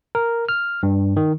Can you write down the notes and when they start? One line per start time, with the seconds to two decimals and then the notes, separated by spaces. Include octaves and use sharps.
0.15 A#4
0.49 F6
0.83 G2
1.17 D#3